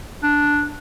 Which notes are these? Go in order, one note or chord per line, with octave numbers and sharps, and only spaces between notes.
D4